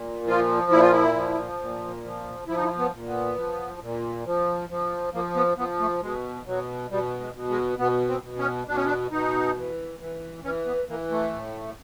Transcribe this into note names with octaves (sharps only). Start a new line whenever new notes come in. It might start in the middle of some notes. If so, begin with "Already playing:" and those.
Already playing: A#2
F3 F4
A#2 E4
F4
E4
F3
A#2
F3
F3 E4
D#4
E4
B3
A#2
B3
F3
A#2
F3
F3
F3 A#3
B3
F3 B3
A3
B2 G#3
B2 F#3
B2 G3
G#3
B2
G#3
B2 B3
C4
B2
C#4
B2 D4
C#4
D4
B2 D#4
E3
E3
E3 C#4
B3
E3 A#3
A3
A2